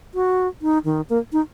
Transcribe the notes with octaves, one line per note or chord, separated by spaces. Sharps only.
F#4
D#4
D#3
A#3
D#4